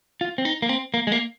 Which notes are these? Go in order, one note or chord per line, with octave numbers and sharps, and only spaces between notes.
F4
C4
D#4
A#3
C4
A#3
G#3
A#3